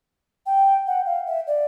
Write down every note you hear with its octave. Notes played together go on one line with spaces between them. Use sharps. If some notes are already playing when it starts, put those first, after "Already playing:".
G5
F#5
F5
E5
D5